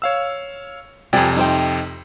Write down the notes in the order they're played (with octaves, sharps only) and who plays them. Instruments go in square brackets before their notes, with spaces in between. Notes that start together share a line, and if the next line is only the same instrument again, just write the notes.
[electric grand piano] C#5 F5 E6
[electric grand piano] F2 C3 [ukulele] G#4 D5 G5
[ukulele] D#4 C5 G5